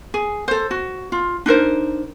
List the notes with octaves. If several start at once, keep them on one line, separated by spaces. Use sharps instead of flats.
G#4
A4 C5
F#4
F4
D4 D#4 A#4 C5